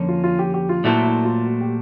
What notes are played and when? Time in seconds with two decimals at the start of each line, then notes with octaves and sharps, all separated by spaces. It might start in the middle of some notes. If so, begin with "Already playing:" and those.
Already playing: F2 D3 F3 A#3 C#4
0.08 F4
0.24 F4
0.39 G4
0.54 G4
0.69 F4
0.84 A#2 F#3 A3 C4 E4
1.05 E4
1.25 F4
1.45 F#4
1.61 G4